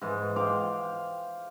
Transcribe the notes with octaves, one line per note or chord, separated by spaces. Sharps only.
G#2 E3 G#3
C5 F5 G5 D6